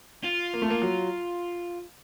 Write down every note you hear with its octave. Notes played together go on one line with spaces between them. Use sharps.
F4
A#3
A3
A#3
F#3